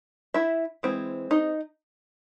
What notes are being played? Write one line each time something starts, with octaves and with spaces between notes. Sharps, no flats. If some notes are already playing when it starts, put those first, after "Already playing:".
E4 E5
E3 G#3 C4
D#4 D#5